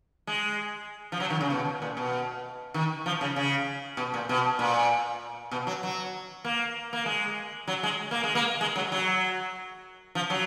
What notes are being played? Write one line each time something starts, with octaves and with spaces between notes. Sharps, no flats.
G#3
F3
F#3
D#3
C#3
B2
A#2
B2
D#3
F3
C#3
C#3
B2
A#2
B2
A#2
B2
F#3
F#3
A#3
A#3
G#3
F#3
G#3
A#3
G#3
A#3
G#3
F#3
F#3
F3
F#3